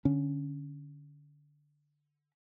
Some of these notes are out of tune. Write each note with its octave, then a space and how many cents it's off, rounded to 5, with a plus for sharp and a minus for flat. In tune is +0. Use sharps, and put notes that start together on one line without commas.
D3 +0 C#4 +10